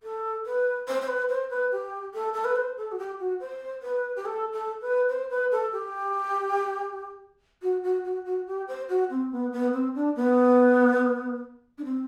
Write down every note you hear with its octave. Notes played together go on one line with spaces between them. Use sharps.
A4
B4
C5
C5
B4
C5
B4
G4
A4
A4
B4
C5
A4
F#4
G4
F#4
C5
B4
G4
A4
A4
B4
C5
B4
A4
G4
F#4
F#4
F#4
F#4
G4
C5
F#4
C4
B3
B3
C4
D4
B3
D4
C4